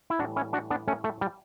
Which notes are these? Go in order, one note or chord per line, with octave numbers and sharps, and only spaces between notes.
E4
A2 E3 G3 D4 F#4
C#4 E4
D4 F#4
B3 D4
A3 C#4
A3
G3